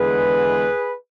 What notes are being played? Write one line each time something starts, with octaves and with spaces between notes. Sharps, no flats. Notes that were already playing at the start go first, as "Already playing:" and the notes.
Already playing: E2 D3 G#3 G#4 B4